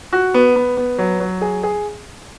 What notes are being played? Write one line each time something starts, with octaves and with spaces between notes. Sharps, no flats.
F#4
B3
B3
B3
F#3
F#3
G#4
G#4